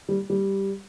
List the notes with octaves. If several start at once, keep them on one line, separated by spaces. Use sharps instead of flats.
G3
G3